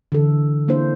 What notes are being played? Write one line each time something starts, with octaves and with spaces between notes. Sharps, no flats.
D3 E3 A4
A#3 D4 E4 C5